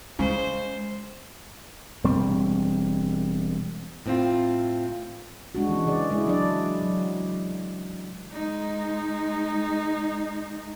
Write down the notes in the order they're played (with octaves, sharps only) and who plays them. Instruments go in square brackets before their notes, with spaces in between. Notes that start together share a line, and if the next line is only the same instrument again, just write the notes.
[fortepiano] C#3 [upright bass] G#3 [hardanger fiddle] C5
[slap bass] E1 G3 C4
[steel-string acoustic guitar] A2 C4 F4
[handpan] G#3 D4 F#4
E3 G#3 C#4
C#3 G#4 D5
G#3 E4 G#4
F#3 D4 D5
F#3
[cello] G#3 D#4